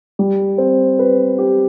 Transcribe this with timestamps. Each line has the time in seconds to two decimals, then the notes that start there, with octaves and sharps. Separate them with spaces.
0.19 G3
0.58 C4
0.99 B4
1.38 G4